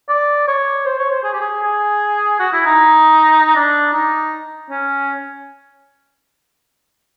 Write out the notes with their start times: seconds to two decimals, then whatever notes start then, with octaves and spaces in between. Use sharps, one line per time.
0.09 D5
0.48 C#5
0.86 C5
0.99 C#5
1.11 C5
1.24 G#4
1.33 G4
1.41 G#4
1.63 G#4
2.40 F#4
2.53 E4
2.66 D#4
3.56 D4
3.94 D#4
4.71 C#4